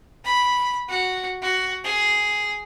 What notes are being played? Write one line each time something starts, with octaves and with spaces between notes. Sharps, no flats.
B5
F#4
F#4
G#4